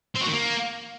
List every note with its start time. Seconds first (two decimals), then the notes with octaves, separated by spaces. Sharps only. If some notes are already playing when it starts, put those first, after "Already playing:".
0.15 C4
0.21 F#4
0.27 D#3
0.33 A#3